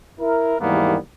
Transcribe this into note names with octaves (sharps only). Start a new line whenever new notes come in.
E4 A#4
D#2 G#2 E3 G3 A#3 B3